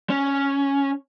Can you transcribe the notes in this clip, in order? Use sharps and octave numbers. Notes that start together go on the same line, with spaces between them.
C#4